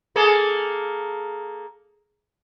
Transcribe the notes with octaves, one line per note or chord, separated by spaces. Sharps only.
A#3 G#4 A4